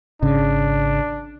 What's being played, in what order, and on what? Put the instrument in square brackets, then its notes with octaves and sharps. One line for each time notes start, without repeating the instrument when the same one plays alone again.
[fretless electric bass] G#1 C#3 [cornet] D4